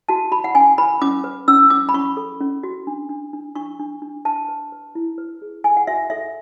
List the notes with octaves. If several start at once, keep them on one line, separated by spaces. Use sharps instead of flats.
F#4 A5
F#4 B5
F#5
C#4 G#5
B4 B5
C#4 D6
B4
C#4 E6
C#4 D6
B5
C#4 C#6
A4
C#4
F#4
D4
D4
D4
D4 C#6
D4
D4
B4 A5
B4
B4
E4
B4
G#4
A4 G#5
F#5
F#4 E5
A4 E5